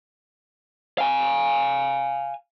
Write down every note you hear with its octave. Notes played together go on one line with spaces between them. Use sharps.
F5 G#5